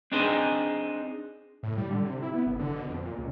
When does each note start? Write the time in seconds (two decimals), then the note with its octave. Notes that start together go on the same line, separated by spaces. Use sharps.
0.12 C4 D4 D#4 G#4 C5
1.63 A2
1.78 G3
1.91 D3
2.05 C3
2.22 E4
2.34 B3
2.46 F#1
2.59 D3
2.75 B2
2.89 F2
3.05 A#2
3.18 C#2